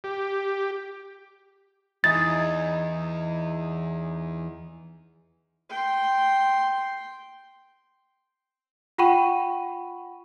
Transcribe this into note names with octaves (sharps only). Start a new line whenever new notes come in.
G4
E2 D#4 E4 G#4 A6
G5 C6
F4 F#5 G5 B5 C#6 D#7